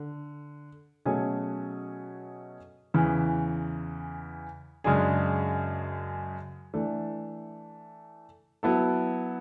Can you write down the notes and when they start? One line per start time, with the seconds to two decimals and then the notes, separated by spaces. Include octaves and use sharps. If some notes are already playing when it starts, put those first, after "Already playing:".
Already playing: D3
1.05 B2 F#3 A3 C#4 G#4
2.94 E2 C#3 E3
4.84 F#2 C#3 G#3 D4 G#4
6.74 E3 A3 D4
8.63 F#3 B3 E4 A4